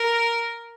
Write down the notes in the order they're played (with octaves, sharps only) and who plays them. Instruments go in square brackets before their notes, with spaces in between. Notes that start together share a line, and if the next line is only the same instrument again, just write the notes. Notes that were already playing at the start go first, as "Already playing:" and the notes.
Already playing: [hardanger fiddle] A#4